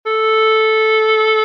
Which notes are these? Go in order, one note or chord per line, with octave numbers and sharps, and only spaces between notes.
A4